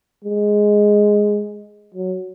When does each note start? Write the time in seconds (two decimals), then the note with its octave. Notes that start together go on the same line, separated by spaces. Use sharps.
0.25 G#3
1.95 F#3